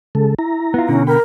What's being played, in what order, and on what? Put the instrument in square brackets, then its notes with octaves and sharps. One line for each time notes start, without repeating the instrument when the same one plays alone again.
[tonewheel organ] C#3 G#3 A4
E4 A#5
[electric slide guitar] B3 F4
[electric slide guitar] B2 D3 [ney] C#4
[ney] A#4 [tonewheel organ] G5 B5